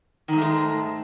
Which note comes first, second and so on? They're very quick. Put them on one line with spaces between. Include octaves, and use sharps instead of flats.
D#3 G#2 A3 G#3